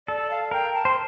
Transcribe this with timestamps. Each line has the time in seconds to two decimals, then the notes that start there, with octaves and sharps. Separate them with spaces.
0.07 A4 D5
0.30 F5
0.51 A#4 G5
0.74 A5
0.85 C5